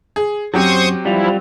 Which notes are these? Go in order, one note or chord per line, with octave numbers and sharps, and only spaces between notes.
G#4
F#2 F#3 C4 G4 C5 C#6 D#6
F3 G3 E4 F4